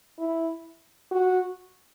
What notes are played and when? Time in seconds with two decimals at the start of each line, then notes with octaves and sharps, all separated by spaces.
0.19 E4
1.12 F#4